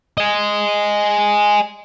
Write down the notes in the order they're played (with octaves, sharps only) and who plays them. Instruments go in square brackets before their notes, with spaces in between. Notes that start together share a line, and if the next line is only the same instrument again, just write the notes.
[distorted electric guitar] D#5 G#5